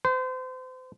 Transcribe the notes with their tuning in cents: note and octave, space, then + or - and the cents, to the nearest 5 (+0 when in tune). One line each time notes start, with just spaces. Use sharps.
C5 -35